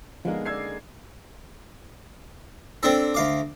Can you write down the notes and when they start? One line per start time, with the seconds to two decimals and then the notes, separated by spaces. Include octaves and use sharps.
0.25 D3 F3 G#3 A#3 B3 D#4 D#5 F5
0.45 C#4 D5 E6 G#6 C7
2.83 C4 D4 A4
3.15 D2 F5 D6